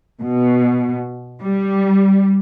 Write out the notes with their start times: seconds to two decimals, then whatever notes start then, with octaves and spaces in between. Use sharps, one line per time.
0.20 B2
1.41 G3